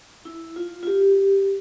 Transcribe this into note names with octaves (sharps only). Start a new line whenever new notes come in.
E4
F4
F4
G4